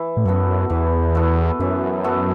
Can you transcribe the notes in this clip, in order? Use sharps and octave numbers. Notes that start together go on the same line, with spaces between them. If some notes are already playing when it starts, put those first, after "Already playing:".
Already playing: E3
A2
F#2 B3 F#4 A4
E2 E3
B3 F#4 A4
F#2 E3
B3 F#4 A4